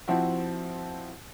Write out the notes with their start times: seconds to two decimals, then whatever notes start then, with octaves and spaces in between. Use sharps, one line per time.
0.08 F3 C4 E4 F#4